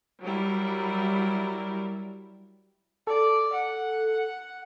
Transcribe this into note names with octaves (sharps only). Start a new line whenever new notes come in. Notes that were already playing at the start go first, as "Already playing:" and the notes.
F#3 G3 E4 A#4
A4 D5
F#5